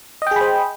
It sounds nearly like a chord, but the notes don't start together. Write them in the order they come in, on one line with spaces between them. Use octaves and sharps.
D#5 G5 G#4 B5 C5